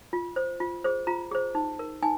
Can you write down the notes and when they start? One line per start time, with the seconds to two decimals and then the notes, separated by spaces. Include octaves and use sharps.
0.13 F4
0.36 C5
0.60 F4
0.84 G#4 C5
1.07 F4 A#5
1.31 G#4 C5
1.55 D#4
1.79 A#4
2.03 D#4 G#5